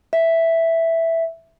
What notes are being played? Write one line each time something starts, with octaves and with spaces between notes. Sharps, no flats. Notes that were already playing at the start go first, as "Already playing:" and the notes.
E5